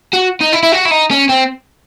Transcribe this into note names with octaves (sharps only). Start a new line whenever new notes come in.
F#4
D#4
E4
E4
F#4
E4
D#4
C#4
C4